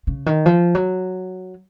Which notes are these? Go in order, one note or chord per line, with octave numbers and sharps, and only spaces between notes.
C#3
D#3
F3
F#3